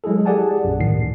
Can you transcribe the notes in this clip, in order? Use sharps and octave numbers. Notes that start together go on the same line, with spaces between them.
F#3 G#3 E4 G#4 A4
G4 G#4 D5 F#5 G#5 A5
A#1 F#2
D2 A2 D#3 C7